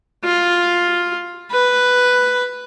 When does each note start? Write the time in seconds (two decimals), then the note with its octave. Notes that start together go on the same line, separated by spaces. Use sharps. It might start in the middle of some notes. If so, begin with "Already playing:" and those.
0.24 F4
1.51 B4